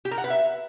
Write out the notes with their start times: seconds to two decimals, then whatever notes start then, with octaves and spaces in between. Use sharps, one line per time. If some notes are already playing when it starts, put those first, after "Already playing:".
0.05 G4
0.11 A#4
0.18 F#5
0.24 B4
0.30 E5